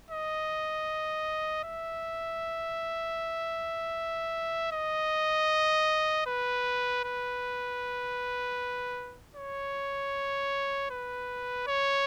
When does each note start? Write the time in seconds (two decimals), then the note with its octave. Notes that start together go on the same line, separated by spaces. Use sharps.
0.11 D#5
1.64 E5
4.72 D#5
6.27 B4
7.05 B4
9.36 C#5
10.91 B4
11.68 C#5